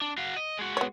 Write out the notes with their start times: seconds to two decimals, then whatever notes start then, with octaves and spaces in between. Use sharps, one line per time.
0.02 D4
0.18 F#4 F5
0.36 D#5
0.59 G#3 F#4
0.77 B3 C#5